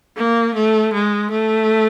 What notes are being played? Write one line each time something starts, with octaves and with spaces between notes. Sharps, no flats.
A#3
A3
G#3
A3